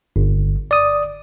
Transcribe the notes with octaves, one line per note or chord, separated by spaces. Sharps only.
G1
D5 D#6